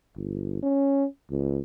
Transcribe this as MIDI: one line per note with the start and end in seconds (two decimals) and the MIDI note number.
0.16 0.61 31
0.63 1.05 61
1.31 1.61 37